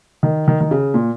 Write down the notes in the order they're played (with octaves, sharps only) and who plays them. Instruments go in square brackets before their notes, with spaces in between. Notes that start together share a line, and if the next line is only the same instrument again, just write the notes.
[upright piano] D#3
D#3
D#3
C#3
A#2